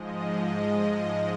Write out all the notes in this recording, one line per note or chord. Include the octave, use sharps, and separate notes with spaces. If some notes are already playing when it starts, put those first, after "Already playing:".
Already playing: G#2 F3 G#3 D#5
D#5
D#5